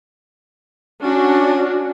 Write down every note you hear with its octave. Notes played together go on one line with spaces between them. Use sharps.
C#4 D4 F#4